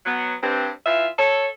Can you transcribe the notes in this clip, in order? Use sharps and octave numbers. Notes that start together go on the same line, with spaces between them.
F#3 B3
G2 C4
E3 F4 E5
A4 C#5